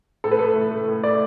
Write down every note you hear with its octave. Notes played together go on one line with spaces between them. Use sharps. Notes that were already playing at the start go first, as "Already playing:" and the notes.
A2 A4
B4
A3 A4
A2
A3
A2
A3 D5